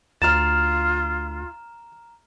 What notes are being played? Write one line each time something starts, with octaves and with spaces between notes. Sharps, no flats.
D2 F4 A#5 F6 A6 E7